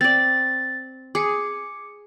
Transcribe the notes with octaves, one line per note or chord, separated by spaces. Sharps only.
C4 D5 A6
G#4 D6 C#7